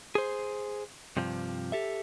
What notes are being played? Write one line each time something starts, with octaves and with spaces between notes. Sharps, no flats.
G#4 C5
G2 C3 F3
G4 A4 E5